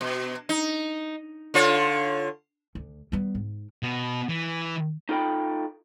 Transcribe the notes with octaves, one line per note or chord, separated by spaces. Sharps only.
B2
D#4
D3 F4 C#5
D2
G3 B3
G#2
B2
E3
D#4 F4 A4 D#5 G5 B5